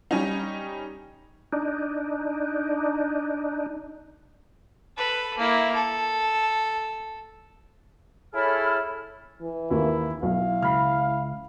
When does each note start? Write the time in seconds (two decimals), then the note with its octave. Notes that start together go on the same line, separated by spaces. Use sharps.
0.11 G3 C#4 D#4
1.53 D4 D#4
4.97 A4 B4
5.38 A#3 E4
5.75 A4
8.34 E4 G#4 A4 C#5 B5 F6
9.42 E3
9.71 D#2 A#3 E4
10.23 B1 E4 F5
10.62 C#2 B5 F6